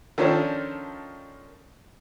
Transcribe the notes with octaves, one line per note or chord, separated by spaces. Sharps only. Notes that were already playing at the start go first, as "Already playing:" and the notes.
D#3 F3 C#4 D4 A4 C5